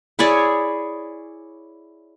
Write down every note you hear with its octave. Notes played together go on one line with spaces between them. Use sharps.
E4 G#4 C#5 D5